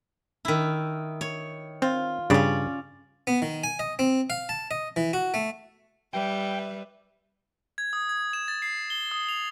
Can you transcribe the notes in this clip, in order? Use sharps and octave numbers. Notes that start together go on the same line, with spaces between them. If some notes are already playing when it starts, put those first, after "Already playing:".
D#3 E4
C#5
C4 F4
G2 C#3 C#4 D5
B3
D#3
G#5
D#5
C4
F5
A5
D#5
E3
F#4
A3
G3 B4 E5 G5
G#6
D#6
G#6
E7
A6
C7
G7
D#6
F7